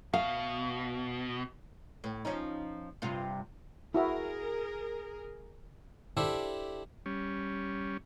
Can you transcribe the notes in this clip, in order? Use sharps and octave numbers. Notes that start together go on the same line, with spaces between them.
B2 F5
A2
F3 C#4 D#4
G2 C3 F4
E4 F#4 G#4 A#4 E5
D4 E4 G4 A4 C5 E5
G3 C#4